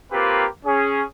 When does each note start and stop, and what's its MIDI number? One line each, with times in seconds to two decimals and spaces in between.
0.12 0.45 58
0.12 0.45 60
0.12 0.45 65
0.12 0.45 67
0.12 0.45 70
0.12 0.45 71
0.65 1.02 61
0.65 1.02 68